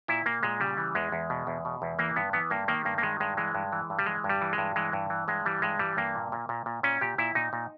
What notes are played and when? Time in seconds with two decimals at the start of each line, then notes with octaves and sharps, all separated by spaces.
0.08 A#2 E4
0.26 A#2 A#3
0.43 A#2 G#3
0.60 C#3 G3
0.77 E3
0.95 E2 G#3
1.12 E2
1.30 B2
1.47 E2
1.65 B2
1.82 E2
1.99 E3 A#3
2.16 G2 B3
2.33 E3 B3
2.50 G2 A#3
2.68 D#3 A#3
2.85 G2 A#3
2.98 A#3
3.02 D#3 G#3
3.20 G2 G#3
3.37 E3 G#3
3.55 G2
3.72 E3
3.90 G2
3.99 G3
4.06 E3 G#3
4.24 G2
4.29 G3
4.41 E3
4.53 G#3
4.58 G2
4.76 E3 G#3
4.93 G2
5.10 E3
5.28 G2 G#3
5.45 E3 G3
5.62 G2 G#3
5.79 E3 G3
5.97 G2 A#3
6.15 A#2
6.32 A#2
6.49 A#2
6.66 A#2
6.83 A#2 C#4
7.01 A#2 G4
7.18 A#2 E4
7.35 A#2 D#4
7.53 A#2